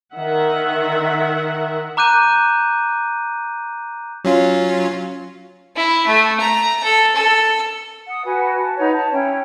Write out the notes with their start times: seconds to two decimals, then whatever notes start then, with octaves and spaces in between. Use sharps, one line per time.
0.13 D#3 E5 F#5
1.97 A#5 D6 F#6 G6 D#7
4.25 F#3 C#4 F4
5.76 E4
6.07 A3
6.40 A#5
6.84 A4
7.15 A4
8.08 F#5 D#6
8.24 F#4 B4 G#5
8.58 A5
8.77 D#4 B4 C#5 F#5
8.92 A5
9.11 C#4 E4 C#5 G5